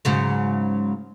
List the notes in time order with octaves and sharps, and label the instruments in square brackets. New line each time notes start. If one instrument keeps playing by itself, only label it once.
[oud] G#2 C#3 F#3